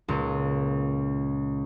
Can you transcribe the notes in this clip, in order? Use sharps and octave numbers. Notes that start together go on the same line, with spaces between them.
C#2 A#2